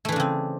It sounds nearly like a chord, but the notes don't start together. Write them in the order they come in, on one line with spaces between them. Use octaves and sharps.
A3 E3 D4 C#3 C4